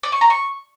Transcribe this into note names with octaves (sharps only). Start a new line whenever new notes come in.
D5
C#6
A#5
C#6